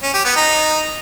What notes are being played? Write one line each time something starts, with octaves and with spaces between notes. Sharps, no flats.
C#4
G4
B3
D#4